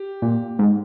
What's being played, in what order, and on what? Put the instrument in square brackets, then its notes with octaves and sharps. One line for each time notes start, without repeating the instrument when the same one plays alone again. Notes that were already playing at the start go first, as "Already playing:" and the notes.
Already playing: [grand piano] G4
[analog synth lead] A#2
G#2